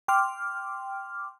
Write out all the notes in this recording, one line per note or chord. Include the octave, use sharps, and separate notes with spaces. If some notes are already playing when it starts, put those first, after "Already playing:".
G5 C6 D6 F6